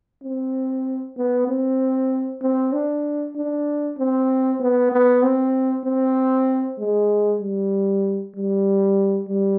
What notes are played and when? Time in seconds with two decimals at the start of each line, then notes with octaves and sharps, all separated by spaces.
0.23 C4
1.17 B3
1.48 C4
2.42 C4
2.73 D4
3.36 D4
3.98 C4
4.60 B3
4.92 B3
5.23 C4
5.85 C4
6.79 G#3
7.41 G3
8.35 G3
9.28 G3